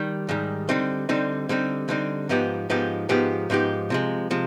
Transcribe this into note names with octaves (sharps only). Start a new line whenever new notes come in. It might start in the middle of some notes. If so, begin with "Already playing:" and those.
Already playing: D#3 G3
G#2 D#3 G3
D3 G3 C4 D#4
D3 G3 C4 D#4
D3 G3 C4 D#4
D3 G3 C4 D#4
G#2 F3 B3 D#4 G4
G#2 F3 B3 D#4 G4
G#2 F3 B3 D#4 G4
G#2 F3 B3 D#4 G4
C3 F3 G#3
C3 F3 G#3